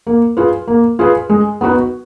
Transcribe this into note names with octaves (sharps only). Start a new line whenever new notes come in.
A#3
F4 G#4 B4
A#3
F4 G#4 B4
G#3
B3 D#4 F#4 B4